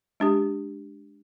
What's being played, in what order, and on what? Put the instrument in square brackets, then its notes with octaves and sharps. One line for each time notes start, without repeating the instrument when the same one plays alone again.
[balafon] G#3 D4 G4